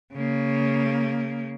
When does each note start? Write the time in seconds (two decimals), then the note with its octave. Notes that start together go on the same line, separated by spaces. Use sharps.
0.13 C#3 A#3